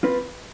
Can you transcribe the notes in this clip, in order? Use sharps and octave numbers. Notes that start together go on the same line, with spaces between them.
C4 F4 B4